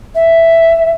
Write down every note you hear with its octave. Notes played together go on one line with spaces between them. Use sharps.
E5